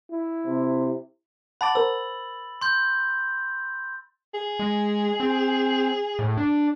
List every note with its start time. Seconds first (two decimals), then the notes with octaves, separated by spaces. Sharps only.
0.11 E4
0.46 C3
1.61 F#5 A5 B5 D6 A6 F#7
1.75 A#4 C5 E6
2.61 C6 G6
4.34 G#4
4.59 G#3
5.20 C4
6.19 A2
6.37 D4